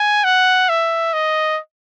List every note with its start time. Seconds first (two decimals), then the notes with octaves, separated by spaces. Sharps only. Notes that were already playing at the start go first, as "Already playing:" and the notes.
Already playing: G#5
0.24 F#5
0.69 E5
1.13 D#5